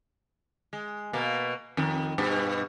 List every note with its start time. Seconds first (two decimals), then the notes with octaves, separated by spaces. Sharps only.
0.73 G#3
1.13 B2 A#3
1.77 F2 D#3
2.18 G2 B2